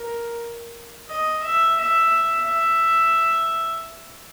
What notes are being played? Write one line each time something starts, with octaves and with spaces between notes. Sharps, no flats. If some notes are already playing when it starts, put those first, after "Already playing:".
Already playing: A#4
D#5
E5
E5
E5